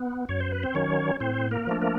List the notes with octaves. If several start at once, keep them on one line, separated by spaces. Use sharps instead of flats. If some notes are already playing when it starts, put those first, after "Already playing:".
Already playing: B3
F#2 C#5
C5
B4
C4 C5
D#3 F#3 C#4 C#5
A2 C4 C5
A#3 A#4
F3 A3 D4
A#3 A#4